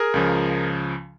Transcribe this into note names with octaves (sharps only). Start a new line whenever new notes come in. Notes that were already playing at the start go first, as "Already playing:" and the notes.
Already playing: G#4 A#4
C#2 C#3 F3